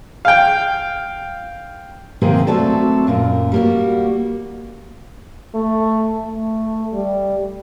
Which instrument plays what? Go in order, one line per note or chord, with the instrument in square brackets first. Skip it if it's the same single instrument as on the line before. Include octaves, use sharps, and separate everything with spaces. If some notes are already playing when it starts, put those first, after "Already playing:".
[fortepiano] F5 G5
[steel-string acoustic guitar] C3 D#3 G#3 A#3 C4 G#4
F#3 A3 C4 F#4 A4 D5
F#2 A#2 A#4
G3 A#3 F#4
[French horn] A3
A3
G3